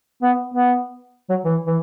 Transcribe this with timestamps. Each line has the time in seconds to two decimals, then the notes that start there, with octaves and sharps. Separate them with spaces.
0.23 B3
0.54 B3
1.29 F#3
1.45 E3
1.67 E3